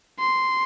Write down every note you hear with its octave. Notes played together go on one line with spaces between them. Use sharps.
C6